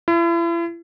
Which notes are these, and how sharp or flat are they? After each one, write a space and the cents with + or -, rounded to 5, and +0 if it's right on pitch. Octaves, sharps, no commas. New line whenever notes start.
E4 +40